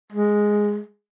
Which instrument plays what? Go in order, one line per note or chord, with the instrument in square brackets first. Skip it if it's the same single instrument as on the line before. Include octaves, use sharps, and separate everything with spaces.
[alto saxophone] G#3